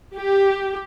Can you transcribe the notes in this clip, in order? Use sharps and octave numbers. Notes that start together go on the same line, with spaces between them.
G4